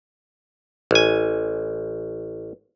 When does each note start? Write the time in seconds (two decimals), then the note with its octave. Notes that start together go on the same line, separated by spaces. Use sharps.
0.91 A1 G#5